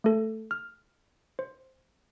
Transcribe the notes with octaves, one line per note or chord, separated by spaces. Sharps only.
A3 A4
F6
C5